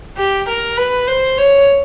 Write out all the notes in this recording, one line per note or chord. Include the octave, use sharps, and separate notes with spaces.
G4
A#4
B4
C5
C#5